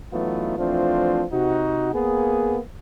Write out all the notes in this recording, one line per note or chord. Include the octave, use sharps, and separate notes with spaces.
E3 F#3 A3 B3 D#4 F4
E3 F3 A3 C4 D4 F4
C3 D#4 F#4
A#3 B3 G#4